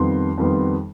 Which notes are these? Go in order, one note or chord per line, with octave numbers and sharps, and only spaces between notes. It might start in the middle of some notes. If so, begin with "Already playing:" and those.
Already playing: F2 D#3 G3 B3 C6
F2 D#3 G3 B3